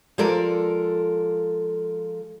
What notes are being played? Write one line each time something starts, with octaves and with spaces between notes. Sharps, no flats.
F3 G#3 A4 A#4 D5